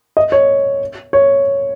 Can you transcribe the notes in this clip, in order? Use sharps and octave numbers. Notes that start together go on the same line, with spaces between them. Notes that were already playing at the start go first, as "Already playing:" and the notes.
D#5
C#5
C#5